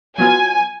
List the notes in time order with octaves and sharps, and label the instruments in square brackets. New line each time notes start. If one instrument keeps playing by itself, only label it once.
[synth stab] F#3 B3 F4 [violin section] G#5